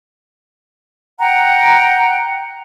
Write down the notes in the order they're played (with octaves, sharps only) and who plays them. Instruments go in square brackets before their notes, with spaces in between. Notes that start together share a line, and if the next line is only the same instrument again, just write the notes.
[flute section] F#5 G5 A#5 F#6